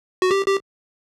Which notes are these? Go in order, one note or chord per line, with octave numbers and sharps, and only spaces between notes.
F#4
G4
G4